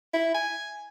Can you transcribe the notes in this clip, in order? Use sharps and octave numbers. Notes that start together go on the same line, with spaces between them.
E4
G#5